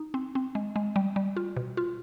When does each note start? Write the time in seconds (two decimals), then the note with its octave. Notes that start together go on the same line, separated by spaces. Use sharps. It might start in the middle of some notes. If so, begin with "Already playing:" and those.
Already playing: D#4
0.14 C4
0.35 C4
0.55 G#3
0.76 G#3
0.96 G3
1.16 G3
1.37 F4
1.57 B2
1.77 F4